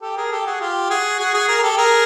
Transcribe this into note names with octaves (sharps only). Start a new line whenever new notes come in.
G4 A4
G#4 A#4
G4 A4
F#4 G#4
F4 G4
F#4 G#4
F#4 G#4
F#4 G#4
G#4 A#4
A#4
G4 A4
G#4 A#4